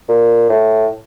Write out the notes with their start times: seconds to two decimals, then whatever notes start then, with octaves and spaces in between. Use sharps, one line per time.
0.09 A#2
0.49 A2